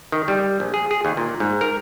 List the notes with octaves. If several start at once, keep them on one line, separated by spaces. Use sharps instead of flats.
D#3
G3
A#1
G#4
G#4
D#2
A#2
G#2
A#4